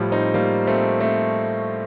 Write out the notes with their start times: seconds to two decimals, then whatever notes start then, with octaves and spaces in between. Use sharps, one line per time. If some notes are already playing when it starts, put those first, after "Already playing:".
Already playing: A2 F3 G3
0.12 C4 D#4
0.34 G3 A#3
0.67 A3 C4
1.00 A3 C4